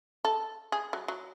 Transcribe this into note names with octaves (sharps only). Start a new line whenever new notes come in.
A4
G#4
F#3
F#3